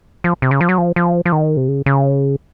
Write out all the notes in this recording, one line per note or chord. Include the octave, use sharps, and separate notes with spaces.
F3
C3
C#3
F3
F#3
F3
F3
F3
D#3
C3
C#3
C#3